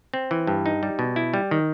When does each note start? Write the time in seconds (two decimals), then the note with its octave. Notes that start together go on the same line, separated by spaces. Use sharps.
0.14 C4
0.31 E3
0.47 G2
0.66 D#4
0.83 G3
0.99 B2
1.16 E4
1.34 G3
1.51 D#3